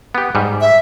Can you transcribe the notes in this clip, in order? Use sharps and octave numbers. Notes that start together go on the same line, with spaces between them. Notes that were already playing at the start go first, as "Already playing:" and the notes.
B3 G4
G#2 G3
E5